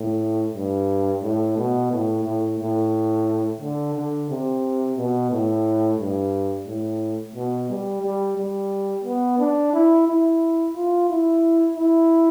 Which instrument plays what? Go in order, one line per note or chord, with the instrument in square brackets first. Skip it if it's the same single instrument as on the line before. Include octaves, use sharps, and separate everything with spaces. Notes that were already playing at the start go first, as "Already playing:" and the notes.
Already playing: [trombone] A2
G2
A2
B2
A2
A2
A2
D3
D3
C3
B2
A2
G2
A2
B2
G3
G3
G3
B3
D4
E4
E4
F4
E4
E4